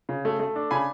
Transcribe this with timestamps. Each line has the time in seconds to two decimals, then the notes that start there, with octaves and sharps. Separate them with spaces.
0.09 C#3
0.25 A3
0.40 A3
0.56 D4
0.71 C#3 G#5 B5